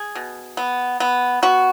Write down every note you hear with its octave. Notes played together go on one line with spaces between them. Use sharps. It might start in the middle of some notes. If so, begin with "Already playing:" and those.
Already playing: G#4
B2
B3
B3
B3 F#4